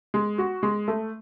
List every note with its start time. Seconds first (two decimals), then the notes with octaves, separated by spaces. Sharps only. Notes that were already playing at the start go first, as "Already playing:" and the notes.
0.14 G#3
0.38 F#4
0.63 G#3
0.88 A3